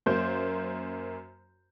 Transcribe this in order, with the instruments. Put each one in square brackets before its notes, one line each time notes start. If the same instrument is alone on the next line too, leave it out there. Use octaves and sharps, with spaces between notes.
[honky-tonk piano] F#2 A#3 C5 G6